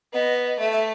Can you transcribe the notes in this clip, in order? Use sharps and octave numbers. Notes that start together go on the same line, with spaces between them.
B3 D#5
A3 E5
E5